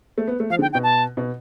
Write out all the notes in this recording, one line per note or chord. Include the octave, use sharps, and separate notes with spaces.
A3
B3
A3
F3 F5
D3
G5
B2 G5
A5
B2